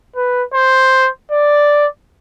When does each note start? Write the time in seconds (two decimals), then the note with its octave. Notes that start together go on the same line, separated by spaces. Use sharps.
0.16 B4
0.54 C5
1.32 D5